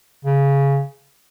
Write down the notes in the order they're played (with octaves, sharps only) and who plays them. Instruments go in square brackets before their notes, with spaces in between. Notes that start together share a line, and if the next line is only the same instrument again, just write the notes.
[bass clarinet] C#3